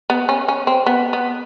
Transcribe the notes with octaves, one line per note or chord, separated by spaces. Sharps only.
B3
C#4
C#4
C4
B3
B3